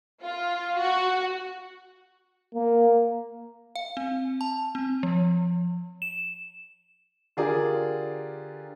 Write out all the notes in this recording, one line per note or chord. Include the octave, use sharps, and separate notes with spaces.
F4
F#4
A#3
F5
C4
A5
C4
F3
E7
D3 F4 G4 G#4 A#4 D5